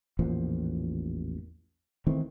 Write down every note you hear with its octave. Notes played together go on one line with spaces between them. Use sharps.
A1 E2 A#2 F3
D#3 E3 A3 C4